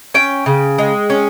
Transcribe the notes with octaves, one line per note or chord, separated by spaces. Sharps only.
C#4 G5
C#3
G#3
C#4